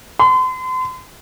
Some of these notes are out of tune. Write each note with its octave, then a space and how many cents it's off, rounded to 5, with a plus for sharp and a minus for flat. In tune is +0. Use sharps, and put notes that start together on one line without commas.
C6 -40